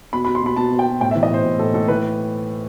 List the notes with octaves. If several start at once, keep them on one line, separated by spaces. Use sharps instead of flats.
B2 B5
B5
B2
C6
B2 B5
B2 A5
B2
G5
B2
A2 G5
E5
E3
D#5
A2 C5
A2
A2 A4
A2 A4
E3 B4